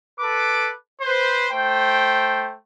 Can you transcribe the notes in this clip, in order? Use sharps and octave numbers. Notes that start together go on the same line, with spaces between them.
A4 B4 D6
B4 C5
A3 C5 G5